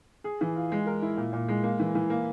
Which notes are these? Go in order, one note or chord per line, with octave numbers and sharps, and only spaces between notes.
G#4
E3
F4
G#3
A#4
E4
A#2
A#2
G#3
A#3
E3
E3
A#3